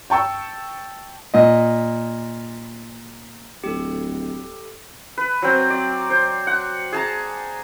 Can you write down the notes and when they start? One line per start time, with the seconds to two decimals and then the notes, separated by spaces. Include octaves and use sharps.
0.10 G5 A5 C#6 E6
1.34 A#2 D#5
3.64 D1 G4 A4
5.18 B4
5.42 F#3 C4
5.70 D5
6.10 C5
6.47 F#5
6.93 G#4 A5 A#5